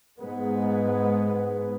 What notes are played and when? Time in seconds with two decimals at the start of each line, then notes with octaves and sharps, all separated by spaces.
0.18 G#2 G#3 B3